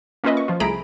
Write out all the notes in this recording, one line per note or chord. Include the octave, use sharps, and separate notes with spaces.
A#3 C#4 F4 B4 D#5 E5
C#6
F3 F4
C2 A3 G#4 A#5 B5 D7